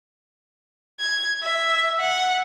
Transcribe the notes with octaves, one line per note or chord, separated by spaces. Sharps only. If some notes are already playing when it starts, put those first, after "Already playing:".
G#6
E5
F#5